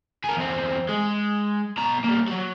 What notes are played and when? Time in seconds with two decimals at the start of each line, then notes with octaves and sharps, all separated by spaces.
0.24 G#4 A#4
0.36 E2 C4
0.89 G#3
1.78 B2 A#5
2.04 G3 A#3
2.28 F#3 F#4